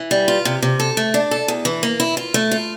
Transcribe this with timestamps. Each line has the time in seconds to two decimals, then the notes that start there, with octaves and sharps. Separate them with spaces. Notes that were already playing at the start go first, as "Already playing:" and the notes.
Already playing: E3
0.11 G3
0.28 F4
0.45 C3
0.62 C3
0.80 A4
0.97 A3
1.14 D4
1.31 A4
1.48 E2
1.65 E3
1.83 A#3
2.00 E4
2.17 F4
2.34 A3
2.51 F4